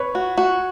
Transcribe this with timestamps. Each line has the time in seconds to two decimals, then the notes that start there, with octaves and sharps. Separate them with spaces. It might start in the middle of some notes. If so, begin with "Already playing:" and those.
Already playing: B4 C#5
0.15 F#4
0.38 F#4